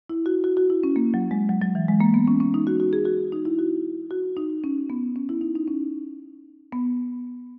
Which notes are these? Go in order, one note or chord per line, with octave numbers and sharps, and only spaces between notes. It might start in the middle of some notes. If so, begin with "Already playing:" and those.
E4
F#4
F#4
F#4
E4
C#4
A#3
F#3
G#3
F#3
F#3
E3
G#3
A#3
B3
C#4
C#4
D#4
F#4
F#4
G#4
F#4
D#4
E4
F#4
F#4
D#4
C#4
B3
C#4
E4
D#4
D#4
C#4
B3